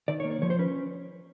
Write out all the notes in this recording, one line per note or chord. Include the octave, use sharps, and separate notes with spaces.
D#3 D5
C#5
A#3
C#5
F3 C#5
C5
C#4 B4